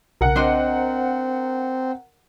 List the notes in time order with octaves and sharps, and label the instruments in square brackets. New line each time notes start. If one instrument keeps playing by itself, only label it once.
[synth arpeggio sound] B1 C#3 [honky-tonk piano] A#4 F#5
[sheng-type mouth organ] C4 [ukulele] D4 C5 D#5